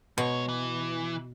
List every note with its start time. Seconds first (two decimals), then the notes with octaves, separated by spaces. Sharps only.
0.18 B2 G#3 C#5
0.49 E3